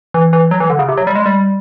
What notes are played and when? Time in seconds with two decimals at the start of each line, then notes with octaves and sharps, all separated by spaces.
0.14 E3
0.33 E3
0.51 F#3
0.60 E3
0.70 D3
0.79 C#3
0.88 C3
0.98 F#3
1.07 G3
1.15 G#3
1.26 G3